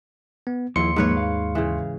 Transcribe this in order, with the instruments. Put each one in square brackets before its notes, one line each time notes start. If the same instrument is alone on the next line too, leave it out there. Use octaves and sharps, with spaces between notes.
[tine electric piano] B3
[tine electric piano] D#2 C6 C#7 [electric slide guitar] F3 E4 G#4
[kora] G#2 B4 C#5 [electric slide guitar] F3 A#3
[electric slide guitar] F5
[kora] C#3 E3